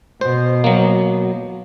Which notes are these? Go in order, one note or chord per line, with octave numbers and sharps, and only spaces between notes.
B2 C5
F#3 A#3